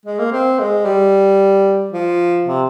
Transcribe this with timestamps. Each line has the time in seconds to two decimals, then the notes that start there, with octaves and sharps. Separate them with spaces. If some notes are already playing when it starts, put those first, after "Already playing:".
0.06 G#3
0.19 A#3
0.32 C4
0.59 G#3
0.85 G3
1.92 F3
2.46 C3